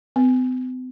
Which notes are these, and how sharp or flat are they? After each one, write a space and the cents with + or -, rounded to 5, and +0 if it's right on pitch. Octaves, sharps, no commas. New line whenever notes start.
C4 -45